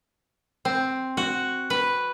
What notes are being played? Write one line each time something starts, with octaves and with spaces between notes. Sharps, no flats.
C4
F#4
B4